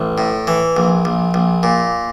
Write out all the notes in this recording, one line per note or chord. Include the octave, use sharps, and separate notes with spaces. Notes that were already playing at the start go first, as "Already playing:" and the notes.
Already playing: A1
A2
E3
A#1
A#1
A#1
A#2